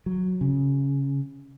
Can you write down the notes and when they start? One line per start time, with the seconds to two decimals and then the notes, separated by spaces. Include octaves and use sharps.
0.06 F#3
0.41 C#3